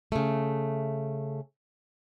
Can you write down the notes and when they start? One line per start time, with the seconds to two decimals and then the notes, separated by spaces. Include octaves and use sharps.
0.12 C#3 A3